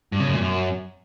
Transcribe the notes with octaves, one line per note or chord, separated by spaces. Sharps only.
G2
C#3
F#2
A#2
F#2